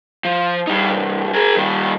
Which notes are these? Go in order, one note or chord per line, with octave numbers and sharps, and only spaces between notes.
F3
G3 D#4
C2 G2
G#4 A#4
D#3 G3